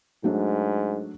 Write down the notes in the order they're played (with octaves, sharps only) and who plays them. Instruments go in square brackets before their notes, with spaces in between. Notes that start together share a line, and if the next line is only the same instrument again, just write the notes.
[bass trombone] G#2 [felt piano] F#3 A3 D4